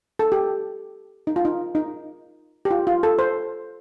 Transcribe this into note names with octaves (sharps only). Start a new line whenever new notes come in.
A4
G4
D#4
F4
D#4
D#4
G4
F4
F4
A4
C5